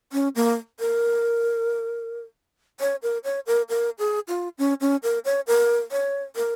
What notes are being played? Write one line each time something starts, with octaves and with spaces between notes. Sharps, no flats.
C#4
A#3
A#4
C#5
A#4
C#5
A#4
A#4
G#4
F4
C#4
C#4
A#4
C#5
A#4
C#5
A#4